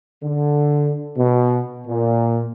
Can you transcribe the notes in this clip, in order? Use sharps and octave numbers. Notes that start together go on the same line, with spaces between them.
D3
B2
A#2